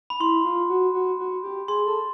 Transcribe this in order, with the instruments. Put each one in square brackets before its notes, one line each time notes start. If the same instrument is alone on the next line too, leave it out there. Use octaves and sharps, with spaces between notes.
[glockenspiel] B5
[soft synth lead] E4 [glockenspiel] C6
[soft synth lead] F4
F#4
F#4
F#4
G4
[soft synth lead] G#4 [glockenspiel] C6
[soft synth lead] A4